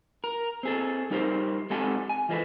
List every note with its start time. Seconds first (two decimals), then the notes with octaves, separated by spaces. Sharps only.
0.24 A#4
0.63 C4 G#4 A4
1.10 G3 D#4 G4 A#4 C5
1.70 G#3 C4 G4 A4 F#5 G#5
2.09 G#5
2.29 E3 F3 G#3 A4 B4